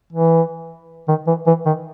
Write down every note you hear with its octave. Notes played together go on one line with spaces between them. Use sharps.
E3
D#3
E3
E3
D#3